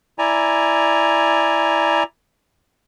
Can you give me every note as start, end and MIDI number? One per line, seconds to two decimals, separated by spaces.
0.19 2.03 64
0.19 2.03 74
0.19 2.03 80
0.19 2.03 82